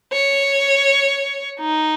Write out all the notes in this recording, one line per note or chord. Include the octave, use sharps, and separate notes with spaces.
C#5
D#4